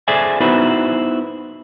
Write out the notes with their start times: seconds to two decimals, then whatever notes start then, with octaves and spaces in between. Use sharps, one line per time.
0.08 G#4 A4 C5 D5 E5 G#5
0.41 B3 D#4 E4 F#4 B4 C5